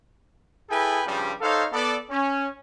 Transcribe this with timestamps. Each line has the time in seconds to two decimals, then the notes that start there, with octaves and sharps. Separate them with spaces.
0.70 E4 G#4 A4 B4 G5 G#5
1.06 G2 C#3 F3 G3
1.42 D#4 A4 C5 C#5 F5
1.72 B3 A4 D5
2.10 C#4